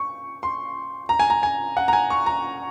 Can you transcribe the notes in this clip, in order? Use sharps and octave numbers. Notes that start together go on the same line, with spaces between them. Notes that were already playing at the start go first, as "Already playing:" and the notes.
Already playing: C#6
C6
A#5
G#5
A#5
G#5
F#5
A#5
G#5
C#6
A#5